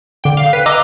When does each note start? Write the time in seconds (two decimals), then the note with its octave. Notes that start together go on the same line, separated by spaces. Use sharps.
0.24 D3 G5
0.37 F5
0.53 B4
0.66 D#5 A#5 D6 E6